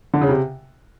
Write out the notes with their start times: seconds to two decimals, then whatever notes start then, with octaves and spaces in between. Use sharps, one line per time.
0.14 D3
0.21 C#3
0.29 C3